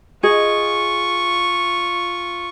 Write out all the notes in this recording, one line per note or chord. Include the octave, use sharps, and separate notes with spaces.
F4 G#4 D#5 C#6